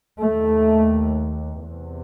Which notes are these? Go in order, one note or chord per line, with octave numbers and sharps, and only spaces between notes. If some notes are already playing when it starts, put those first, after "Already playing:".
D#2 A3
E2 C3